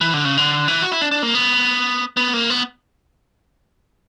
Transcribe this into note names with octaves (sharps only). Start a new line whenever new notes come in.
E3
D3
C#3
D3
E3
F#4
E4
D4
D4
A#3
B3
B3
A#3
B3